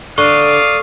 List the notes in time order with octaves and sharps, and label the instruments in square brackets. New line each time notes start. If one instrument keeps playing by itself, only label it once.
[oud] D3 [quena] D5 [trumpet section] F5 D#6 [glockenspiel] C#6